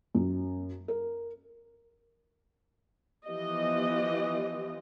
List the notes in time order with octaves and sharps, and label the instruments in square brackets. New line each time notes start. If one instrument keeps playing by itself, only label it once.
[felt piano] F#2
A#4
[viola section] E3 F3 B3 G4 D#5